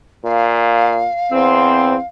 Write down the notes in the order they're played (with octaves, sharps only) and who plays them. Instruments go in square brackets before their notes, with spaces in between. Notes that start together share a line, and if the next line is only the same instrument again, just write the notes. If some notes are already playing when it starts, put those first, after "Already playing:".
[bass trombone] A#2 [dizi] F5
[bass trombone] E2 [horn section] C4